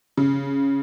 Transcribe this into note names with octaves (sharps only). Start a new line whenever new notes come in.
C#3